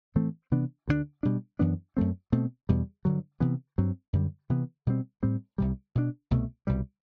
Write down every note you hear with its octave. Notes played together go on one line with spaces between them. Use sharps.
A2 E3 A3 C4
C3 E3 B3 D4
D2 D3 G3 D4
B2 G3 D4
F#2 E3 B3 D4
F#2 F#3 A3 C4
B2 A3 C4
E2 B2 G3
G2 D3 F#3
C3 E3 B3
G2 F#3 C4
F#2 D3 G3
C3 E3 B3
B2 G3 C4
A2 G3 C4
C2 C3 G3
B2 A3 D4
C2 B2 A3
C2 B2 G3